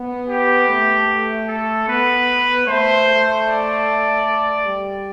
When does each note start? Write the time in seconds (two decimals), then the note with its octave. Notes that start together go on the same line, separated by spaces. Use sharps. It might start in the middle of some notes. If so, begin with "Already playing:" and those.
Already playing: B3
0.29 G4
0.69 A3
1.08 A3
1.48 A4
1.88 B3 B4
2.67 A3 C5
3.07 A3
3.46 D5
4.66 G3